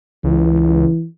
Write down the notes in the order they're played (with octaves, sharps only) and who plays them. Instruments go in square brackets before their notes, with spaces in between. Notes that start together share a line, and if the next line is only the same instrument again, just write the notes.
[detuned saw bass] C#2 [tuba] E3